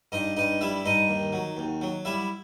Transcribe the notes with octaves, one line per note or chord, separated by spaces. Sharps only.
G2 D#4 D#5
G2 D#4 D#5
G3 E4 E5
G2 D#4 D#5
D#2
F#3
D#2
F#3
G3 E4 E5